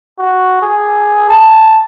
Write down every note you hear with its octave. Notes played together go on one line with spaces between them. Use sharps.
F#4
G#4
A5